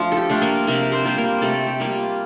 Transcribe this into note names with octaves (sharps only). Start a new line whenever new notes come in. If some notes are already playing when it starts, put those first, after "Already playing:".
Already playing: F3 A3 D4 F4
A4
G4
A3 D4 F4
A#3 A#4
C3 A#3 A#4
C4 C5
G3 A#3 F4 C5
A#3 A#4
C3 A3 A4
G4
G3 A#3 F4